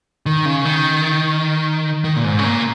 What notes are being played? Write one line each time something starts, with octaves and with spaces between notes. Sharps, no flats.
D#3
C#3
D#3
D#3
A#2
G#2
C#3
A#2